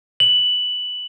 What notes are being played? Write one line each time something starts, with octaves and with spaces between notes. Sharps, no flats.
F#7